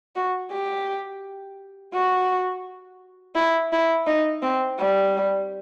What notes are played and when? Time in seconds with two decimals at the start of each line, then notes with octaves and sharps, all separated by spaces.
0.16 F#4
0.51 G4
1.94 F#4
3.36 E4
3.72 E4
4.07 D#4
4.43 C4
4.79 G3